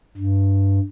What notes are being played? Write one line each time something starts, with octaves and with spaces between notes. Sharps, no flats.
G2